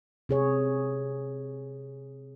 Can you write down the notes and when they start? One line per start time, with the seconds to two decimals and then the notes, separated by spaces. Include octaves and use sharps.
0.29 C3 G#4 C#5